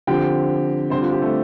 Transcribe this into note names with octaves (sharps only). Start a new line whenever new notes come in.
D3 F3 C4 G4 G5
D3 G3 C4 C5
F4
G4
A3 A4